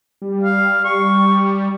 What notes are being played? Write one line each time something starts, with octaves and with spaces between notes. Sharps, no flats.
G3
F5
G3 C#6